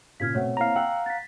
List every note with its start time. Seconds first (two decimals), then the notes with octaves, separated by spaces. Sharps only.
0.20 A#2 C#3 F6 G#6 B6
0.35 B2 A3 C4 C#5 F#5
0.57 A#3 C4 E4 F5 A#5
0.76 F#5 G5 E6 F#7
1.06 A6 B6